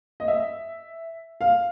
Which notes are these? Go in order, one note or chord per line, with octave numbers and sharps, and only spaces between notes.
D#5
E5
F5